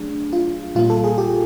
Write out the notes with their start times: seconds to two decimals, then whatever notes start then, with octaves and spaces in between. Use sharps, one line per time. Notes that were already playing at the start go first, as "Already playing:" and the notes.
Already playing: F#3 A3 D4 G#4
0.33 F4
0.75 A#2 G3 A#3 F4
0.90 A4
1.04 G#4
1.18 G4